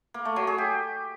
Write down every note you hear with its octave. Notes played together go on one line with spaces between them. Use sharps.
A#3
A3
F#3
G#4
G4